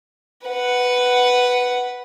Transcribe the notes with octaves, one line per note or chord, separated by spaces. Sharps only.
B4 F#5